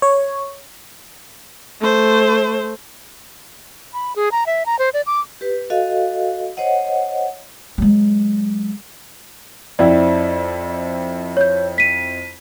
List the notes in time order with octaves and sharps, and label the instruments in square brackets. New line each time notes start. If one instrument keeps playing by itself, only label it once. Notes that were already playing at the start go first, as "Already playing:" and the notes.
[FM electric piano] C#5
[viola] A3 C5
[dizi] B5
G#4
A#5
E5
A#5
C5
D5
D6
[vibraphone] G4 B4
F#4 A4 D#5 F5
C5 C#5 D#5 F#5
[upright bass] F#3 G#3
[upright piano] F2 C4 E4 [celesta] D5
[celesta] C#5 G6
B6 D#7